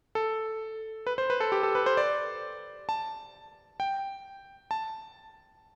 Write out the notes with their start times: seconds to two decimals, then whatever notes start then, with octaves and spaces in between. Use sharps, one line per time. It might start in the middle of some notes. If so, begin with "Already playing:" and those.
0.15 A4
1.07 B4
1.18 C5
1.30 B4
1.40 A4
1.52 G4
1.63 A4
1.75 B4
1.86 C5
1.97 D5
2.89 A5
3.80 G5
4.71 A5